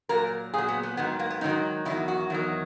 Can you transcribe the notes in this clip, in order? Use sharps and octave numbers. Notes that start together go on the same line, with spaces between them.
A#2 F#3 A#4
A#2 F#3 G#4
B3
B3
G#2 D#3 F#3 B3
A#3
B3
G#2 D#3 F#3 D#4
E2 D#3 F#3 E4
F#4
E2 D#3 F#3